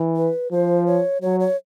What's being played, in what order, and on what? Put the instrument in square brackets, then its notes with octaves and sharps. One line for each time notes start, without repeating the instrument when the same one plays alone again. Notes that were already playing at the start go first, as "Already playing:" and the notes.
Already playing: [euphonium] E3
[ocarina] B4
[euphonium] F3 [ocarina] C5
[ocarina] C#5
[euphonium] F#3 [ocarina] C#5
[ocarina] C#5